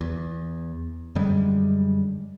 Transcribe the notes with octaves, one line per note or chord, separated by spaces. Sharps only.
E2
F#2 D3 G3 G#3